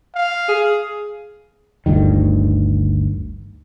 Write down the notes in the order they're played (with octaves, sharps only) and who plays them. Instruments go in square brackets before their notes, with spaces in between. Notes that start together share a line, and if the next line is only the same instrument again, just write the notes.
[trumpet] F5
[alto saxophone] G#4
[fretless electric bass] G1 D2 G2 D#3